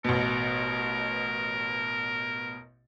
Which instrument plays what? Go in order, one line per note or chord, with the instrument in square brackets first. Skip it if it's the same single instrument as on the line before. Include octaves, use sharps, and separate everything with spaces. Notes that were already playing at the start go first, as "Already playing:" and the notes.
[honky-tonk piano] A1 B2 [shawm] A#4